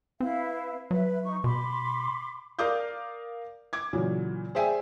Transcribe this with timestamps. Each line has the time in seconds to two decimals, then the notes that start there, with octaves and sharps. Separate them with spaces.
0.20 C4 E4 B4 F5
0.91 F#3 B4 E5
1.23 D#4 C#6
1.44 B2 B5 C6 D6
2.59 A#4 D5 F5 D6 D#6 G6
3.73 D6 G#6
3.93 A#2 C#3 E3 F#3
4.55 G#4 C5 D5 E5 G5 G#5